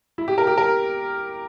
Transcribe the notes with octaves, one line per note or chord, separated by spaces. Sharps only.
E4
G4
A#4
G4
A#4